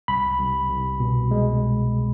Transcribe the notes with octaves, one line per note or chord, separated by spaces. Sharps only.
C2 B5
C2
C2
B2
G#3